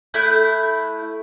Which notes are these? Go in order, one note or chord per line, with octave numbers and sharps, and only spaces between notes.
A3 E4 F#6 G6